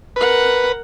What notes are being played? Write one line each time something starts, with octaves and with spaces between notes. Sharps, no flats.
A#4 B4 F#5